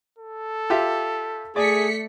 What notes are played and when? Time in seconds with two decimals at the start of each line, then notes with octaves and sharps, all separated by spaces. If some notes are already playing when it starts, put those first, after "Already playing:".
0.18 A4
0.70 F4 G4 E5
1.56 A3 G#4 D5 B6 C#7